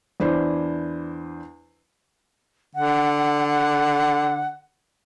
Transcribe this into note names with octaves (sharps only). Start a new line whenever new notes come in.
E2 D4 E4 C5
D3 F#5
F#5